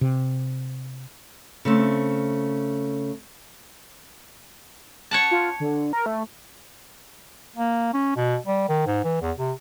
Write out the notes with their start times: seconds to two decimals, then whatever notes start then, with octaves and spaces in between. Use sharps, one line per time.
0.01 C3
1.65 C#3 A3 C4
5.11 C#5 F#5 A5
5.31 F4
5.60 D3
5.93 A#4
6.06 A3
7.56 A#3
7.93 C#4
8.16 B2
8.46 G3
8.69 D#3
8.86 G#2
9.04 E3
9.22 E2
9.38 C3